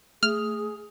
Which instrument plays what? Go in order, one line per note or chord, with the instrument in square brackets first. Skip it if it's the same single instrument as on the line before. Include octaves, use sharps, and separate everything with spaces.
[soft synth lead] A3 [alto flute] G#4 [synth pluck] F6